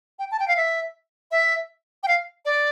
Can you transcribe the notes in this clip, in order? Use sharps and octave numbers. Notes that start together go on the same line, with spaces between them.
G5
A5
G5
F5
E5
E5
G5
F5
D5